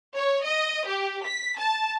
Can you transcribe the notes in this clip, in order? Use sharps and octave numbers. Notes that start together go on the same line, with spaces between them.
C#5
D#5
G4
B6
A5